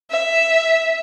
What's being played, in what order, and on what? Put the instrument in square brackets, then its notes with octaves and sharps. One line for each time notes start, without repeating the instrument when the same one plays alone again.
[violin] E5